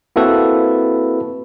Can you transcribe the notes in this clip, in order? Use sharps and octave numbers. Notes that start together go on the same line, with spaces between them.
A#3 C4 E4 F#4 A4 B4